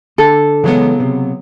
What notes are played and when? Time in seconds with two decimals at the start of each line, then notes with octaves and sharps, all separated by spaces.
0.18 D3 A4
0.64 C#3 E3 F#3 G#3 B3 C#4
1.00 C3